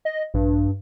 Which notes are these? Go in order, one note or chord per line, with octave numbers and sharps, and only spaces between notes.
D#5
A#1 G2